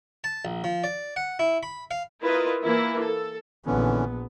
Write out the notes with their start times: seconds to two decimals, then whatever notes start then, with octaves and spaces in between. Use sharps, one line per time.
0.24 A5
0.45 A#1
0.64 F3
0.84 D5
1.16 F#5
1.39 E4
1.63 B5
1.91 F5
2.22 E4 F4 A#4 B4 D#5
2.63 E3 A#3 E4
3.02 A4
3.66 A#1 D3 E3 B3 C#4